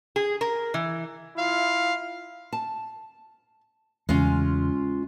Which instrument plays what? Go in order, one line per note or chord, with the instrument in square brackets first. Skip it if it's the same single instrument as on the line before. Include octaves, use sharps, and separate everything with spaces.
[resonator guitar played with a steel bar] G#4
A#4
E3
[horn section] E4 F4 F5
[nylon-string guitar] A5
[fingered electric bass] E2 C#3 [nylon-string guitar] G#3 C#4 F4